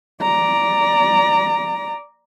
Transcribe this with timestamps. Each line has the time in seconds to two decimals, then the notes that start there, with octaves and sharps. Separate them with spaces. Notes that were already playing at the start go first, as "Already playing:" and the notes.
0.22 D5 A#5